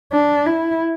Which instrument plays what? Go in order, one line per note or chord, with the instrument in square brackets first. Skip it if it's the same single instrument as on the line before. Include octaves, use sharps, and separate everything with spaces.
[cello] D4
E4